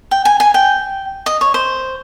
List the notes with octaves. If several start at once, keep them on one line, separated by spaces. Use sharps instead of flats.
G5
G#5
G#5
G5
D#5
C#5
C5